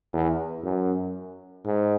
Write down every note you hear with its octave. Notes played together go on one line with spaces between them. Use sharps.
E2
F#2
G#2